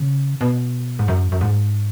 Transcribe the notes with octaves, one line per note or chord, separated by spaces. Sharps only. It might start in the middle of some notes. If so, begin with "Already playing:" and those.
Already playing: C#3
B2
G#2
F#2
F#2
G#2